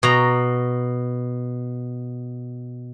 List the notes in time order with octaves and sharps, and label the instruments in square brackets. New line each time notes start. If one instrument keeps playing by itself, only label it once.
[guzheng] B2 A#5